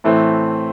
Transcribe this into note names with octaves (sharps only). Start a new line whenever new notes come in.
A2 E3 A3 C4